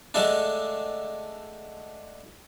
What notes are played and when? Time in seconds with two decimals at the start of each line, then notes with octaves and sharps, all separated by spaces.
0.14 D3 G#3 A3 D4